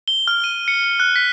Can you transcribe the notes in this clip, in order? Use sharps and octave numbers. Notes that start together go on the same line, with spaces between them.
G7
F6
D#7
C#7
F#6
B6